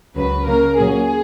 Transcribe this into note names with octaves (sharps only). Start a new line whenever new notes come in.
C#2 C#3 F#3 B4
C#3 F#3 A#3 A#4
A#2 F#3 A#3 C#4 G#4